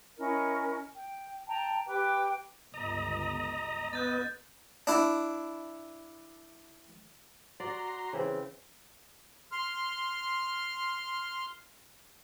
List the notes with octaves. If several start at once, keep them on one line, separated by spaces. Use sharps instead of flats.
C#4 E4 A#4 D#5
G5
G5 A5 A#5
G4 B4 G5 D6
G1 C#2 D#5 A#5
B3 D#5 F#6 G6 A6
D4 E4
F#4 D5 A#5 C6
C#3 E3 C4
C6 F6